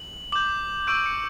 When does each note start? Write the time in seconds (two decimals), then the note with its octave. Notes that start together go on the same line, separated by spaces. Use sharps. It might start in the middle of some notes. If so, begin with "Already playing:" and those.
Already playing: F#7
0.32 D6 G6 F#7
0.87 C#6 E6 G6 D7
1.06 C#7